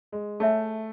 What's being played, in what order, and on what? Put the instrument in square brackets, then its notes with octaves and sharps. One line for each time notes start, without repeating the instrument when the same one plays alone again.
[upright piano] G#3
[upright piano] A3 [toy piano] G#4 C#5 E5 G#5